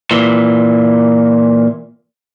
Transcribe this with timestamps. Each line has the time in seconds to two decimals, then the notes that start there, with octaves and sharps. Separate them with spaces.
0.11 A#2 E3